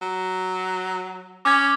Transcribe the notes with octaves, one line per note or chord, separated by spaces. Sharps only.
F#3
C#4 D6 G#6